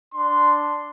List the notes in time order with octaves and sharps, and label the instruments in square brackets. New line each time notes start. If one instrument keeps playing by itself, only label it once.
[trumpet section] D4 C6